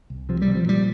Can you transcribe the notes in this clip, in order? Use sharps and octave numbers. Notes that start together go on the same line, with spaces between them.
C2
C3 F3
G3
C3
F3
A#2 G3